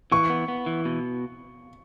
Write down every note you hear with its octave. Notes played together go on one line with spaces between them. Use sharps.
E3 C#6
B3
B3
E3
B2